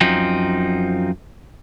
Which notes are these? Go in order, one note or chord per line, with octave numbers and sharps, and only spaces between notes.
F#2 F3 C4 D#4